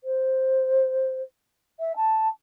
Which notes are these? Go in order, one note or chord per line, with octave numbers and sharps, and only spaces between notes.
C5
E5
A5